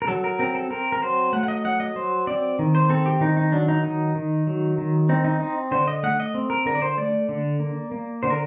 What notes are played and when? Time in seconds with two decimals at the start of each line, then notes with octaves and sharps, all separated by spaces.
0.02 A#4
0.07 F#3 A4
0.24 A#4
0.39 C4 A#4
0.55 A4
0.70 C4 A#4
0.92 A#4
1.02 F#3 C5
1.33 A3 F#5
1.43 F#5
1.48 D#5
1.65 F#3 F#5
1.80 D#5
1.96 F#3 C5
2.27 C4 D5
2.59 D#3
2.75 C5
2.89 C4 A4
3.06 G4
3.21 D#3 D#4
3.37 D#4
3.52 F#3 D4
3.68 D#4
3.84 D#3 D#4
4.15 D#3
4.47 F#3
4.78 D#3
5.09 C4 D#4
5.25 D#4
5.40 C4 D#4
5.71 D3 C5
5.88 D#5
6.03 A3 F#5
6.20 D#5
6.34 C4
6.50 A#4
6.66 D3 A#4
6.75 D5
6.82 C5
6.97 A3 D5
7.29 D3
7.60 A#3
7.92 A#3
8.23 D3 C5
8.30 A#4